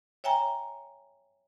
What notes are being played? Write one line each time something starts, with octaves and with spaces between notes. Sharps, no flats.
C#5 E5 G5 G#5 A#5